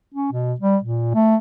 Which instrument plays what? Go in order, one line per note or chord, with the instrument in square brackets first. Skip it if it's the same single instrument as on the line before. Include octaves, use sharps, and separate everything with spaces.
[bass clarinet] C#4
B2
G3
A#2
A3